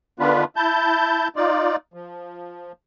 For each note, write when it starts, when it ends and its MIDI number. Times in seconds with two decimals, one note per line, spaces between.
0.19 0.44 50
0.19 0.44 51
0.19 0.44 59
0.19 0.44 62
0.19 0.44 65
0.19 0.44 71
0.56 1.28 64
0.56 1.28 81
0.56 1.28 91
1.36 1.76 63
1.36 1.76 65
1.36 1.76 74
1.94 2.72 53